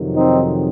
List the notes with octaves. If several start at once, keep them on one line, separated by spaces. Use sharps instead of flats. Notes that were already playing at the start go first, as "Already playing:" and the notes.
Already playing: F2 C3 D#3 F#3
C4 D#4